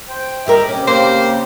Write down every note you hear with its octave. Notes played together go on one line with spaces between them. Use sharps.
C5 G5
G2 G3 A#4 D#5 E5
C#3 C4 C#4 G4
A#3 C5